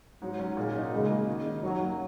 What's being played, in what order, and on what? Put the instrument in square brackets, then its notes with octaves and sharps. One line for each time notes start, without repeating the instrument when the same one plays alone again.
[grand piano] G#2 [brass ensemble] F#3
[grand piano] F#3 C#4
[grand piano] A#2 [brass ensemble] G#3
[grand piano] F#3 D#4
[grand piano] C#3 [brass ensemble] G#3
[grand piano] A#3 F#4
D#3
A#3 D#4
[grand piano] F#2 [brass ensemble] F#3
[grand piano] F#3 A#3 F#4